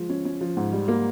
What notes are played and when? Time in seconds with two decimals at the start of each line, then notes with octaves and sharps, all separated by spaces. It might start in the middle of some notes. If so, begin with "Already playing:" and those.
Already playing: F3 G#3
0.10 C#4
0.25 C#4
0.41 F3
0.57 G#2
0.73 G3
0.88 A#3